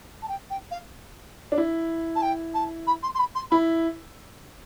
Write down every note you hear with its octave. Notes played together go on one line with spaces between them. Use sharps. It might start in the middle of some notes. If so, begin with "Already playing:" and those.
A5
G5
G5
F5
D4
E4
A5
G5
A5
B5
C6
C6
B5
C6
E4 B5